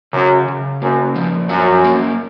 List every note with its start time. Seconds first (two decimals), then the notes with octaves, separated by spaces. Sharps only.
0.13 F#2 C#3
0.48 C#3
0.82 F#2 A#3
1.16 F3
1.49 F#2 F#3
1.84 A#3